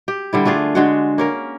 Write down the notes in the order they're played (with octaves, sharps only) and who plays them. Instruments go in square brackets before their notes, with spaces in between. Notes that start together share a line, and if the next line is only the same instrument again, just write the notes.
[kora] G4
D3 G3 E4
A3 D4 F4 G#4
D3 G#3 F#4
A#3 C#4 A#4